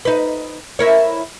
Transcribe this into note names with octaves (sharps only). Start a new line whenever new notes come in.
D#4 B4
E4 A#4 C#5